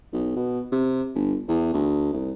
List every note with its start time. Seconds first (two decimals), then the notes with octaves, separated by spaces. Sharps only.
0.13 B1
0.36 B2
0.72 C3
1.15 G1
1.48 E2
1.74 D2
2.13 C2